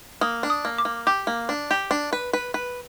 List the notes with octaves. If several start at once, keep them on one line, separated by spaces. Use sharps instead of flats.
A#3 D#6
D4
D#6
A#3
D6
A#3
G4 D6
A#3
D4
G4
D4
B4
B4
B4